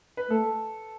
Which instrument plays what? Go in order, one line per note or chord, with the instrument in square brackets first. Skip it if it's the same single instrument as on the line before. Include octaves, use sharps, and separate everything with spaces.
[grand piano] B4
[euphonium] A3 [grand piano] A4